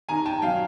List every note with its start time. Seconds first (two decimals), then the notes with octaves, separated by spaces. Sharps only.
0.09 D#3 G#5 A#5
0.26 G5 A5
0.42 F#3 F5 G5